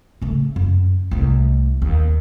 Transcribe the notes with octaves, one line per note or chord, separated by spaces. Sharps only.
C#3 A3
F#2
C2 A3
D#2